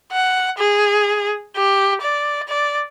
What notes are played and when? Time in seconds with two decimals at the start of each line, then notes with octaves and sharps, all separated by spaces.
0.12 F#5
0.58 G#4
1.56 G4
2.01 D5
2.48 D5